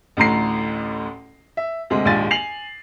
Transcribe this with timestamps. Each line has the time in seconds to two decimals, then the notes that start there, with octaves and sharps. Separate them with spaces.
0.17 A1 D2 A2 A#5 C7
1.57 E5
1.90 D2 C3 G#3
2.05 A#1 D#2 G#2 F4 G#5 A6
2.31 G#5 C7 F7 F#7